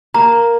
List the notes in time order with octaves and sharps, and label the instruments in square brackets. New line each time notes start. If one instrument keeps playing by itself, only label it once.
[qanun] A#3 [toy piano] A#5